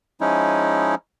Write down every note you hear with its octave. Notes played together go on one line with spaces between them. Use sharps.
F3 G#3 C#4 D#4 E4